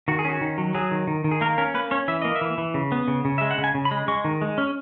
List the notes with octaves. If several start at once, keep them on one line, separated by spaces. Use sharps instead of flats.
D#3 F#4
G#4
C#4 F#4
D#3
F#3
F#3 G#4
D#3
D#3
D#3
G#4
A#3 A#4
C#4 A#4
A#3 B4
C#4 C#5
E3 E5
A#3 D#5
E5
E3
E3
C#3
B3
C#3
C#3
G#3 E5
F#5
C#3
G#5
C#3
B5
G#3
G#3 C#6
D#3
G#3
C#4